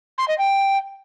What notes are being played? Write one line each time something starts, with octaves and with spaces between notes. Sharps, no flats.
C6
D#5
G5